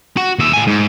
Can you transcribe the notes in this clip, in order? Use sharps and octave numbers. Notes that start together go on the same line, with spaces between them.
F#4
D#2 E5
A2 G#5
G#2